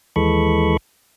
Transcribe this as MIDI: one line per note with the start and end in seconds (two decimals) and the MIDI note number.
0.16 0.77 39
0.16 0.77 52
0.16 0.77 56
0.16 0.77 69
0.16 0.77 83
0.16 0.77 85